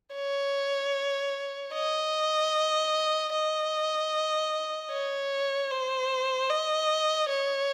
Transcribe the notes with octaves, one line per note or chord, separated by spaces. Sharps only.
C#5
D#5
D#5
C#5
C5
D#5
C#5